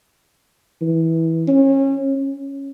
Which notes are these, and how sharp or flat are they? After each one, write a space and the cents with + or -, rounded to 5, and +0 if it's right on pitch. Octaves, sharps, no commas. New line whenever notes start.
E3 -15
C#4 -30
C#4 -5